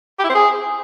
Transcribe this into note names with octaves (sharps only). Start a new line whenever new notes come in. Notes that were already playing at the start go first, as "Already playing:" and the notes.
G4
E4
C4
G#4